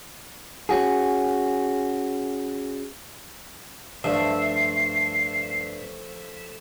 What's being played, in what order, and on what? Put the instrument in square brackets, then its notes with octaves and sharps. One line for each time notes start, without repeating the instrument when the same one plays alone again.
[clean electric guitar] C#4 F#4 G#4
[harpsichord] G2 [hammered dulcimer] F3 A3 [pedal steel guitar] E5 [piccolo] C7